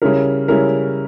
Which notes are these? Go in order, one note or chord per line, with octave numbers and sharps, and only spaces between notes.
C#3 G3 C#4 E4 A#4
C#3 G3 C#4 E4 A#4